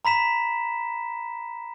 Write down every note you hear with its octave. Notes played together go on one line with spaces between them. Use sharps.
A#5 B5 B6 E7